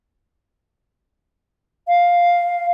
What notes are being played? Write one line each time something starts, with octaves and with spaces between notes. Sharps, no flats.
F5